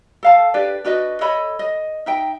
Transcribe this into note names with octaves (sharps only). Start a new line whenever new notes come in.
A4 F5 A5
D4 G4 B4 D5
D4 F#4 B4 D#5
A4 C#5 D#5 B5
D#5
D#4 E5 G5